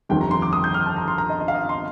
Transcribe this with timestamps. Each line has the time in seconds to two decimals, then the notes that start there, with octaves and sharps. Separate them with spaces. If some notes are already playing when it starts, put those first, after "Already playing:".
0.09 G1 F2 D#3 G3 G5
0.21 A#5
0.31 C6
0.42 D6
0.53 D#6
0.64 G6
0.74 F6
0.86 A5
0.97 A#5
1.08 C6
1.18 A#5
1.29 D#5
1.40 D#5
1.48 F5
1.54 D#5
1.69 C6